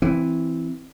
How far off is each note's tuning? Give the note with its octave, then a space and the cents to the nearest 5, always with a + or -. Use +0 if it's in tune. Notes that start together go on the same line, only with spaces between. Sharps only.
E3 +0 C4 +0